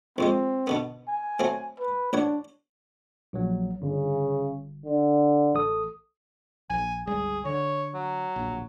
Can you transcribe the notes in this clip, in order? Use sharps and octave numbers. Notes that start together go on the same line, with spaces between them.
C2 F2 G#3 C4
B2 D3 B3
G#5
F#3 A3 C4
B4
A1 D4 C#5 F#5
A#1 F#3
G1 C#3
D3
A1 A4 D#6
A#1 G#5
G1 C#2 G3 G#4
D3 C#5
F#3
D1 A#1